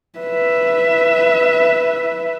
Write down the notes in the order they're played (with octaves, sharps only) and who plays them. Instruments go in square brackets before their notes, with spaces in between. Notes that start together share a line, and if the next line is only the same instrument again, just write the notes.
[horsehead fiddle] B4 E5